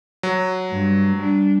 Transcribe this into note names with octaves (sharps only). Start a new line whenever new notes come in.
F#3
G2
G3 D4